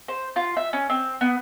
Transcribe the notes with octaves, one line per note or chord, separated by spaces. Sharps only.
C5
F4
E5
C#4
C4
B3